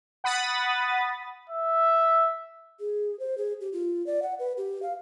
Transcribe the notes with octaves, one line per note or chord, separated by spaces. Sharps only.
F#5 B5 D#6 A6
E5
G#4
C5
G#4
G4
F4
D5
F#5
B4
G4
F5